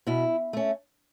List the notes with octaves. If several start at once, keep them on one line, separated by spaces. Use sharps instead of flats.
B2 E4
A3 C#4